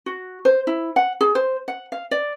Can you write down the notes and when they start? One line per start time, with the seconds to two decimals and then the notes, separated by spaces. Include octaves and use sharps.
0.06 F#4
0.45 C5
0.67 E4
0.96 F#5
1.21 G#4
1.35 C5
1.68 F#5
1.92 F5
2.11 D5